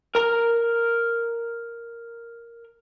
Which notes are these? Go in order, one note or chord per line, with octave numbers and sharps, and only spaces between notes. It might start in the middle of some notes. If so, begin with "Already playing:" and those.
A#4 A#5